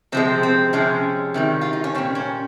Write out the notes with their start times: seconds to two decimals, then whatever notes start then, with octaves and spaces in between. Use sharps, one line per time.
0.12 C3 F3 G#3 C4
0.43 C4
0.73 C3 F3 G#3 C#4
1.34 C3 D#3 G3
1.61 F4
1.73 D#4
1.84 C#4
1.95 A#2 G3 C4
2.15 C#4